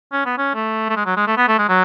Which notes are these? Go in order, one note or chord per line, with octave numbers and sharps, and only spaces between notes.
C#4
B3
C#4
A3
A3
G#3
F#3
G#3
A3
B3
A3
G#3
F#3